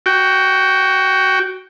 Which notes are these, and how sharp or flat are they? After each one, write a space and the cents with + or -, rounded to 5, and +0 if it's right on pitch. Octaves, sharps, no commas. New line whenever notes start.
F#4 +15 G5 +0